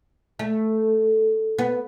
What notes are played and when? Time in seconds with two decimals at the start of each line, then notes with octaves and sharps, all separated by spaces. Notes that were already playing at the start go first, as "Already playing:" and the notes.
0.39 A3
1.59 B3